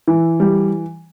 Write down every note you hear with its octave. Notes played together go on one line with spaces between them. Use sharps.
E3
G3